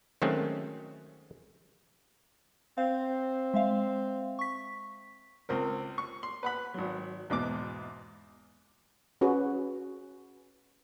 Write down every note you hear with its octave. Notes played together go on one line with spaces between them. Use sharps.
D#3 F#3 G#3 A3 C4 C#4
C4 F5
G#3 E5 F5
C#6 B6
C#2 C4 A#4
C#6
C6
B4 F#5 B5
G#1 F#3
E2 G#2 B2 D6
C#4 F#4 G#4 B4